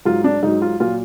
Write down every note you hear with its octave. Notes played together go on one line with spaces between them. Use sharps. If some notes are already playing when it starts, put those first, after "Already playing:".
G#2 F#3 F4
D4
G#2 F#3 D#4
F4
A#2 F#3 F4